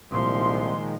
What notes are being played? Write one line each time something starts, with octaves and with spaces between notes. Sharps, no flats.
C2 A#2 D#3 F3 G#3 C6